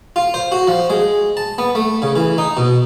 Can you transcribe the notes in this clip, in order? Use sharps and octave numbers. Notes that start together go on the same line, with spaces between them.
F4
C5
F#4
F3
G#3
A5
B3
A3
C#3
E3
D#4
B2